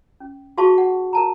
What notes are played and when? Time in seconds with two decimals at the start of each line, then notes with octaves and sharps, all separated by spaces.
0.20 C#4
0.57 F#4 G#4 F5 A5 C6 C#6
0.78 F#5
1.13 A#4 A5 A#5